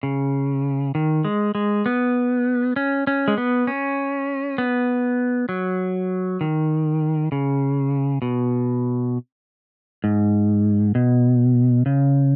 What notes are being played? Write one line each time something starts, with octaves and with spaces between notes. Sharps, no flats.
C#3
D#3
G#3
G#3
B3
C#4
C#4
G#3
B3
C#4
B3
F#3
D#3
C#3
B2
G#2
B2
C#3